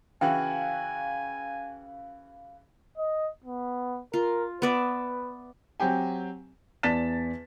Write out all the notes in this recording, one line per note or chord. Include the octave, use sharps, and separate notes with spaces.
C#3 E3 F#4 F5 G5 G#5
D#5
B3
F4 A#4
B3 B4 D5 E5
F#3 C4 G4 G#5
E2 D5 A5 A6 B6 E7